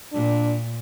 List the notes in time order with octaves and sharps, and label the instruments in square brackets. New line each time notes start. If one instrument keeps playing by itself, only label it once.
[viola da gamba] A#2 [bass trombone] D4